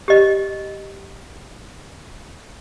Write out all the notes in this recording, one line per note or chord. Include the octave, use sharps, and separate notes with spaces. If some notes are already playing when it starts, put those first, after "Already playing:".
G4 D#5